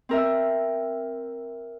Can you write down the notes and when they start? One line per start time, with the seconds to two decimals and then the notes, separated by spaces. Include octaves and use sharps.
0.09 C4 A#4 E5